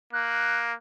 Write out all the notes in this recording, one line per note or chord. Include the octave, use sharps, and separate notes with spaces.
A#3 F#6